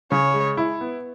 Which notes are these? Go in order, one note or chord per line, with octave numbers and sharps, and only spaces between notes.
C#3 C#5
G#3
E4
B3